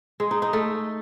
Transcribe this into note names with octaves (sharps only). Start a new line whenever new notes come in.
G#3
D#4
D#4
A3